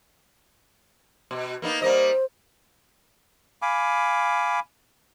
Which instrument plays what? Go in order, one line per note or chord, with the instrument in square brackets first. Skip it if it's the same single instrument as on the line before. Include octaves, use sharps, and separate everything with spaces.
[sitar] B2
A#3 B3 D#4
[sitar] G3 A#3 D#5 [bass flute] C5
[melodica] F5 G#5 B5 D6